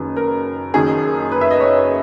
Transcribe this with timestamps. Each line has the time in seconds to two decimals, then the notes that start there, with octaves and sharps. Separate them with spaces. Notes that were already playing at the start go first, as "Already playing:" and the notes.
Already playing: F#1 F#2 D#3 B4
0.17 A#4
0.74 F#1 F#2 D#3 G#4
1.32 B4
1.41 E5
1.51 D#5
1.60 C#5